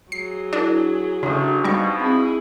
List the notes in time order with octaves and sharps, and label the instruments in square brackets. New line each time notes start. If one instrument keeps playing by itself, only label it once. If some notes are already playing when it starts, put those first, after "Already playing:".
[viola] F#3 G#4 [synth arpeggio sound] C7
[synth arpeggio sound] D4 [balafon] E4 A#4
[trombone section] A1 [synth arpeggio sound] C#3 [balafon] D4 F#4
[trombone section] F2 B2 [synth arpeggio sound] G3 C#6 [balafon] D#4
[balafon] C4 [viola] E4 G#4